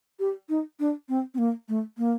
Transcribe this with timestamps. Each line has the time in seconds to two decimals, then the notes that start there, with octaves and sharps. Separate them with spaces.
0.19 G4
0.49 D#4
0.80 D4
1.09 C4
1.34 C4
1.38 A#3
1.68 A3
1.98 A#3